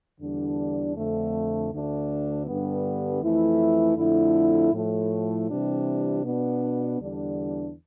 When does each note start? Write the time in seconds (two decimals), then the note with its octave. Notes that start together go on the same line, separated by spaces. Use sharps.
0.19 E2 D3 G3 D4
0.95 F2 D3 A3
1.71 D2 D3 A3 D4
2.46 G2 D3 G3 B3
3.22 F2 E3 A3 E4
3.97 F2 D3 A3 E4
4.73 A2 F3 A3
5.49 C3 E3 G3 D4
6.24 B2 B3 D4
7.00 E2 D3 G3 D4